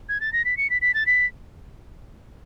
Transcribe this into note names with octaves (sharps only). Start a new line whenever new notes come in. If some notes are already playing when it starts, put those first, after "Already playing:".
G#6
A6
A#6
B6
C#7
B6
B6
A6
B6